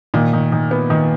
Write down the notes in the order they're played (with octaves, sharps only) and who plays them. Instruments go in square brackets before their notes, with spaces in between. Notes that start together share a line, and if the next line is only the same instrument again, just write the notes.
[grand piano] A#2 [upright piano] D#3
[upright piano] D#3
D#3
B3
D#3